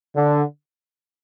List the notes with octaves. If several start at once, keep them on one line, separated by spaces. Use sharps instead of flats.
D3